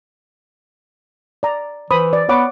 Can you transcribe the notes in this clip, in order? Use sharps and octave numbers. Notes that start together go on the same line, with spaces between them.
D5 A#5
E3 C5 B5 D#6
D5
B3 C#5 F#5 D6